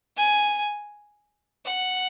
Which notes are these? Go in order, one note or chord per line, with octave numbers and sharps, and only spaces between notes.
G#5
F#5